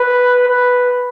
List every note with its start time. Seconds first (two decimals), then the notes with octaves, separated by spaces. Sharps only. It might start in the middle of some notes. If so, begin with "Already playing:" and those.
Already playing: B4
0.48 B4